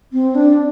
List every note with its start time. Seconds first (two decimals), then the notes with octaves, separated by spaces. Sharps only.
0.13 C4
0.35 D4